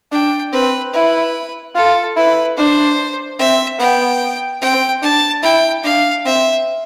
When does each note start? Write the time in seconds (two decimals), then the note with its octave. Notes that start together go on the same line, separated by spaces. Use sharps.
0.12 D4 G5
0.53 C4 B4
0.94 E4 B4
1.75 F4 A4
2.16 E4 B4
2.57 D4 C5
3.39 C4 E5
3.80 B3 G5
4.62 C4 G5
5.02 D4 A5
5.43 E4 G5
5.84 D4 F5
6.25 C4 E5